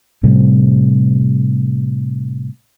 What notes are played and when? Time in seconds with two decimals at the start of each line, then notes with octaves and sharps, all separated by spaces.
0.23 A2 C3 G3